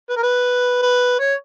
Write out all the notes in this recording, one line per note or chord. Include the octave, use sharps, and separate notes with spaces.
B4
A#4
B4
B4
C#5